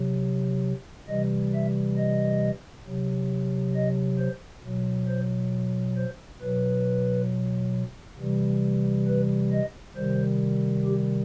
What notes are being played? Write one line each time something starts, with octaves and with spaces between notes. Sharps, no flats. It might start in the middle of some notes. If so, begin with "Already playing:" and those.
Already playing: C3 F#3
C3 E3 G3 D#5
E5
D#5
C3 F#3
D#5
C5
B2 F#3
C5
C5
B2 F#3 B4
C3 E3 G3
B4
D#5
C3 D#3 G3 C5
G4